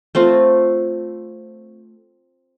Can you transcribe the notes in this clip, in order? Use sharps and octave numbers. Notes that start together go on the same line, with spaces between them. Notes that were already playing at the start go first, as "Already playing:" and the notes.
A3 C4 F4